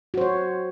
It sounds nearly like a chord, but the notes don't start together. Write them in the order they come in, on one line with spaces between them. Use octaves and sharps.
F#4 C5 C#5